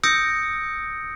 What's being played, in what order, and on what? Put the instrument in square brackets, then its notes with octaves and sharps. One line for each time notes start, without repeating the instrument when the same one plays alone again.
[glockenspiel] D#6 E6 G6 A#6 C#7 D7